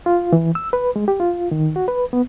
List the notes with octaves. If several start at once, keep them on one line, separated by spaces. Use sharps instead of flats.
F4
E3
E6
B4
G#3
G4
F4
D#3
F#4
B4
B3